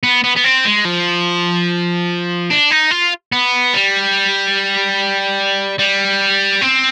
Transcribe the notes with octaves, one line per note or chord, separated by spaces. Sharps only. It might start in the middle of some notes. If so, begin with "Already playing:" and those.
B3
B3
B3
C4
G#3
F3
D4
D#4
F4
B3
G3
G3
C4